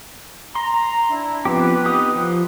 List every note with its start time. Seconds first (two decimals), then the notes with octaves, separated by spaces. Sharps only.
0.55 A#5 C6
1.10 D4 E4
1.45 F3 B3 C4 G4 B4
1.85 D#4 G4 D#6
2.15 F3